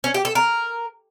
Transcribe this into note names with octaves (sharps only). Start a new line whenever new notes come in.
C#4
G4
A4
A#4